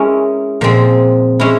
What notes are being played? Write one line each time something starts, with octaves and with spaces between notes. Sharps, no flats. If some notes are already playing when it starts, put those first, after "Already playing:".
Already playing: G#3 C#4 E4 A#4
A#2 F3 G#3 C4
G#3 C#4 E4